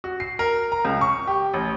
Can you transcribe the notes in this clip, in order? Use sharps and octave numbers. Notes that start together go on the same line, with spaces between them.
F#4
C7
A#4
A#5
C#2
C#6
G4
A1